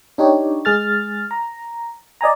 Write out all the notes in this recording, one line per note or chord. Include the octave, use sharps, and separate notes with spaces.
D4 D#4 G4 C#5
G#3 G#4 F6 A6
A#5
D5 D#5 G#5 A#5